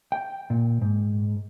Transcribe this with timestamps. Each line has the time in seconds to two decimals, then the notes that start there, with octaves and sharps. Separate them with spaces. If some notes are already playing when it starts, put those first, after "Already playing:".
0.12 G5
0.50 A#2
0.82 G#2